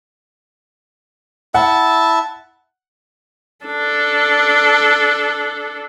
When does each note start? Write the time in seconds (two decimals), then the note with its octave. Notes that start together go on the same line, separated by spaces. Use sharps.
1.55 E4 E5 F#5 A5
3.66 D4 A4